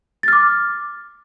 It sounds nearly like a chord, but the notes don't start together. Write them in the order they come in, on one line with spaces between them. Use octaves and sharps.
A6 F6 D6